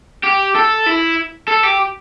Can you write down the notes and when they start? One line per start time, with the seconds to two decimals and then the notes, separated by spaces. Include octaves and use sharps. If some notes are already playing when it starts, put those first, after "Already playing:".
0.24 G4
0.55 A4
0.86 E4
1.48 A4
1.63 G4